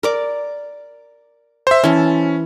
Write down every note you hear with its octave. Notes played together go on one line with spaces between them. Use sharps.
A#4 D5 D6
C5 E5
E3 C#4 A5